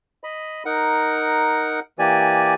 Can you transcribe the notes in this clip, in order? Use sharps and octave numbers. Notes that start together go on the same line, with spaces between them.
D#5 B5
D#4 A#4 F#5
E3 A#3 G4 D5 G#5